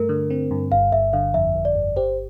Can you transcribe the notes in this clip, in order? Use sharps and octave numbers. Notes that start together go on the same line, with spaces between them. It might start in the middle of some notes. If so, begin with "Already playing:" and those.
Already playing: G2 A3 A#4
D3
C4
G2
G1 F5
G1 E5
D3 F5
F2 E5
G1
D5
G1
G4 C5